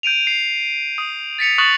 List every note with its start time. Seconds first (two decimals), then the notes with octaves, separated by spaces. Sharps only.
0.03 G6 D7 D#7 F7
0.27 C7
0.98 D#6
1.39 A6 B6 C#7 F7
1.58 C#6 D#6 F#6 A6 F#7